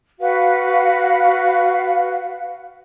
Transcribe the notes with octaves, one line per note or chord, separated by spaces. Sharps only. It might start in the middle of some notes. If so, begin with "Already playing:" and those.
F#4 B4 F5 F#5